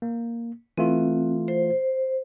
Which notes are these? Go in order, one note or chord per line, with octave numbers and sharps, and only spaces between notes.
A#3
E3 A3 C4 F4
C5